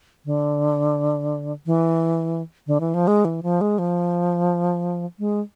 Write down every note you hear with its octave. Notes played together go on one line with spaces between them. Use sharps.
D3
E3
D3
E3
F3
G#3
E3
F3
G#3
F3
G#3